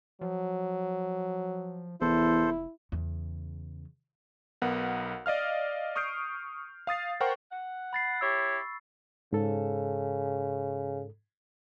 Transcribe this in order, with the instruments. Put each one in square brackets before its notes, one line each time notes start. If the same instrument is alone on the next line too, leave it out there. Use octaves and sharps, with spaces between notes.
[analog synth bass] F3 [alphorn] F#3
[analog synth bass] F1 [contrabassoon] E2 [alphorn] E4 [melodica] A4 C5
[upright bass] E2 C#3
[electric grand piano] B1 B3 A#4 F#5
D5 D#5 F5 F6
C#6 D#6 F6 G6 C7 D7
F5 D#6 A6 C7
A#4 C5 F#5 G5 C#6
[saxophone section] F#5
[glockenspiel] B5 A6 C7
[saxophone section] E4 G4 C#5 [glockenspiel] C#6 E6
[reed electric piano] G#2 A4 [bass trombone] C#3